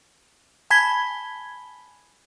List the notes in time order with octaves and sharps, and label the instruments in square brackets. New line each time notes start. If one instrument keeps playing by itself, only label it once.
[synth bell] G#5 A5 B5 G#6 B6 G7